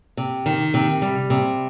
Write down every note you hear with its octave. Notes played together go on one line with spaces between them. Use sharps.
C3
D#3
C3
G3
C3